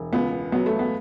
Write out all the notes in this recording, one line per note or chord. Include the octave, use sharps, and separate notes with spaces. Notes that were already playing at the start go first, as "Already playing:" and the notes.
Already playing: E1
C#2 B3
F#3 B3
A3
B3